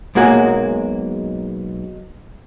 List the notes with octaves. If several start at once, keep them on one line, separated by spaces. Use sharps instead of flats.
B1 G#3 A#3 F#4 G#5 A#5